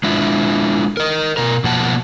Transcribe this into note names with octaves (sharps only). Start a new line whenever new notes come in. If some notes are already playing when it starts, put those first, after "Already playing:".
G#3 D4 E4 F4
A#4 D#5
B2 A#4
B2 F3 A#3 F#5 A5